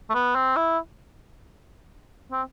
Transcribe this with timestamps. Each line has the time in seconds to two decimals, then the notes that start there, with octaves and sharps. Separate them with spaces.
0.10 A3
0.14 B3
0.35 C4
0.56 E4
2.32 C4